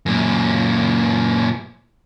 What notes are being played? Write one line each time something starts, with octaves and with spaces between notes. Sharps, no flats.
F#2 A#2